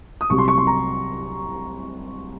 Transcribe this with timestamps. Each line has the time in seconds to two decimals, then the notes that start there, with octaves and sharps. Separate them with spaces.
0.21 D#6
0.30 C2 C3 F#3 C#6
0.38 C6
0.48 C#6
0.58 C6
0.67 A#5